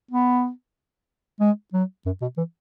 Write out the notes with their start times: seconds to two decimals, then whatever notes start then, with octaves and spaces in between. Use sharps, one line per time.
0.11 B3
1.41 G#3
1.73 F#3
2.06 F#2
2.22 B2
2.37 E3